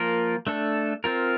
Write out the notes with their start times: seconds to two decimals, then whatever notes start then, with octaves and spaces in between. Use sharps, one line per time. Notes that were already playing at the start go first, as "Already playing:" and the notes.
Already playing: F3 A#3 F4 A#4
0.47 A3 D4 A4
1.04 C4 F4 A#4